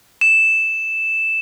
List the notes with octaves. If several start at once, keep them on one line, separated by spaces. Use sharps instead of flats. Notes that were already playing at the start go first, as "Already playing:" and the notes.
E7